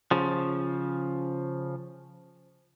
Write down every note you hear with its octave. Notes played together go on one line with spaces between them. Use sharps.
C#3 F3